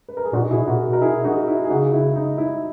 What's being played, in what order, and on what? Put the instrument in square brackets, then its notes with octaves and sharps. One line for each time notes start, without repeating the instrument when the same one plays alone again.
[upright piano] B4
A#4
G#4
[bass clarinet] A#2 [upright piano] D#4 F#4
[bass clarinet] B2 [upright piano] E4 G#4
[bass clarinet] A#2 [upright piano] F#4 A#4
[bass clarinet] B2
[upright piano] A#4
E4 G#4
D#4 F#4
E4
G#4
[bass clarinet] C#3 [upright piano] D#4 F#4
[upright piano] E4
D#4
E4